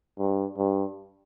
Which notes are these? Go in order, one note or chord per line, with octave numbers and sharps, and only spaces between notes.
G2
G2